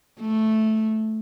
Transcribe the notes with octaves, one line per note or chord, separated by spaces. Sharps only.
A3